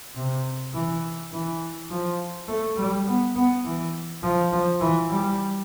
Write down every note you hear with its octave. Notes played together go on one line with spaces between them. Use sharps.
C3
E3
E3
F3
A3
G3
B3
B3
E3
F3
F3
E3
G3